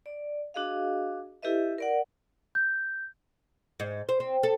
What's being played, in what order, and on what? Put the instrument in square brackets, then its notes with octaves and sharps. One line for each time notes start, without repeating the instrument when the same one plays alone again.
[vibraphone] D5
D4 F#4 G#4 D#5 F5
E4 G4 A4 B4 D#5 E5
A#4 D5 F#5
[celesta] G6
[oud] G#2
C5
C4
A4